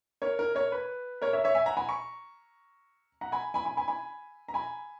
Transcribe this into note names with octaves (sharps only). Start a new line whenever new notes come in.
A#4 C#5
A#4
A#4 C#5
B4
A#4 C#5
C#5 E5
C#5 E5
E5 G#5
F#5 A#5
G#5 B5
A#5 C#6
F#5 A#5
G#5 B5
G#5 B5
G#5 B5
G#5 B5
G#5 B5
A#5
G#5 B5